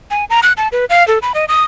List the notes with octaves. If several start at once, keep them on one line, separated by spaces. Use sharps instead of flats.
G#5
A#5
F#6
A5
B4
F5
A4
B5
D#5
D#6